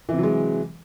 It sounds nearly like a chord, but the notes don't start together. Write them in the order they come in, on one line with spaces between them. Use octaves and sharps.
E3 C3 F#3 G#3